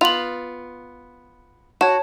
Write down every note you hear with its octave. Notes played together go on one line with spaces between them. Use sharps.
B3 F4 F7 F#7
F#4 C#5 A5